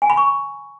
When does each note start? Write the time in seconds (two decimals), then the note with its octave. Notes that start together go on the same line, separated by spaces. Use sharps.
0.02 G#5
0.10 B5
0.17 C#6